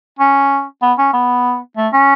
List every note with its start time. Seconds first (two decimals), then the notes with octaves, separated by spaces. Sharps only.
0.19 C#4
0.82 B3
0.98 C#4
1.13 B3
1.77 A3
1.93 C#4